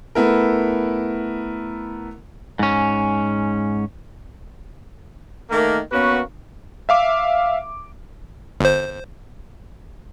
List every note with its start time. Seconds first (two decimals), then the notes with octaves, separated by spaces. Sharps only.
0.15 A3 B3 E4 A#4
2.59 G#2 C#4
5.50 D#3 A3 A#3
5.92 A#3 B3 C#4 F#4 B4
6.89 E5 F5 D6
8.61 G1 C5